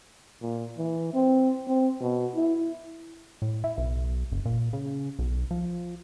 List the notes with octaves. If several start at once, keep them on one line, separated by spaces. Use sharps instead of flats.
A#2
E3
C4
C4
B2
E4
A2
E4
B1
F#1
A#2
C#3
B1
F3